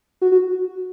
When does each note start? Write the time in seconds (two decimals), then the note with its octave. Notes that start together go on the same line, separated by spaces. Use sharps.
0.22 F#4
0.32 F#4